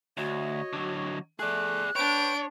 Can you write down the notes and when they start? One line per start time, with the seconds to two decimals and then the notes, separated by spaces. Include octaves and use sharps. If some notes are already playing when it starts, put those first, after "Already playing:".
0.17 D2 F#4 C#5 D#5
0.73 D3 F#3
1.39 A3 G#4 D5 F#6
1.96 D4 B4 C#5 G5 D7